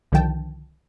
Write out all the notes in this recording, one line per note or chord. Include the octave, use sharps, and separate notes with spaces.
C2 D3 D#3 F3 G5 A5